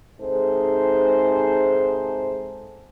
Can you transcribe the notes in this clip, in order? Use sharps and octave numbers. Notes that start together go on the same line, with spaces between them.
G#2 C3 D#4 G#4 A4 C5